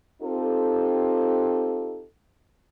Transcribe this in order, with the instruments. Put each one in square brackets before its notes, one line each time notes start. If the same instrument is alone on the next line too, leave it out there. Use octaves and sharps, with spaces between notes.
[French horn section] C4 D#4 F4 G4 A4